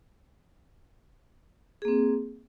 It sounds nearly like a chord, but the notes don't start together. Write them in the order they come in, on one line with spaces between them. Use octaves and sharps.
G#4 A#3 C4